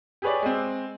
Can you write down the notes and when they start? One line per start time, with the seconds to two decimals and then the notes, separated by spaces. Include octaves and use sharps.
0.22 G4 G#4 B4 C#5 D5
0.42 G#3 C4